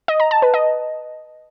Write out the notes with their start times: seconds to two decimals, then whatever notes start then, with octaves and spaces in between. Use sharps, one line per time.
0.08 D#5
0.20 A#5
0.31 A5
0.42 B4
0.54 D#5